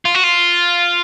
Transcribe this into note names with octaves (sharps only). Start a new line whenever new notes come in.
F4
F#4
F4